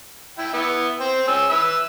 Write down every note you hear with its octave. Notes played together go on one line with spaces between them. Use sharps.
E4 G5
B3 E4
C5 G5
C#4 G#4 E6
B4 E5 E6